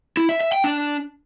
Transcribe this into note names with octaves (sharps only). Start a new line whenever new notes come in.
E4
E5
E5
G5
D4